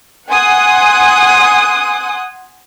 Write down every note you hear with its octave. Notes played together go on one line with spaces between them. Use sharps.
F#5 G#5 C6 D#6 F#6